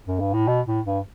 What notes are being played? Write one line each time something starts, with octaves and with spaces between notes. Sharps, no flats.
F#2
G2
A2
B2
A2
G2